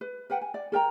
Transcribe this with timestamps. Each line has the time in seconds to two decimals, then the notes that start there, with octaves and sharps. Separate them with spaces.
0.01 B4
0.30 A#4 B4 F#5 G5
0.41 G#5
0.54 D5
0.72 A4 A#4 G5 A#5